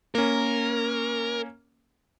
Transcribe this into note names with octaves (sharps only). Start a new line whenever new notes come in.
A#3 C#4 A#4